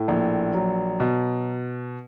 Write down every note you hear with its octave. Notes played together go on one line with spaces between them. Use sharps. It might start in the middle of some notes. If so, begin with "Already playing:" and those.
Already playing: A2
A#1
F#3
B2